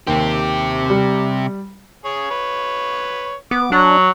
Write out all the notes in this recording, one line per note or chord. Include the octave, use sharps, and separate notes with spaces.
D#2 C3 G4
G3
G#4 C#5
B4 C#5
B3 D6
F#3 D4 C#5 F#5